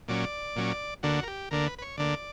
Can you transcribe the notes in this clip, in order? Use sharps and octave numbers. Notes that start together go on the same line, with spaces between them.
A#2 F#3 C#4 D5
A#2 F#3 C#4
D2 D3 A#3 D4 F#4
A#4
G4
D2 D3 A#3 D4 A#4
B4
B4
C#5
D2 D3 A#3 D4 D5